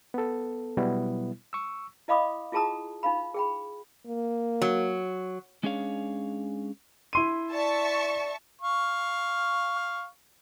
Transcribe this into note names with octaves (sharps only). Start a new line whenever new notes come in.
B3 A4
B2 F#3 G3 B3 E4
C#6 E6
E4 D#5 F5 B5 D6 D#6
E4 F4 G#4 A5 A#5 D#6
D#4 F4 F5 B5
G#4 G5 B5
A#3
F#3
G#3 C#4 D4 G#4 C#5 F5
E4 C6 D#7
D5 E5 A5 C#6
F5 C#6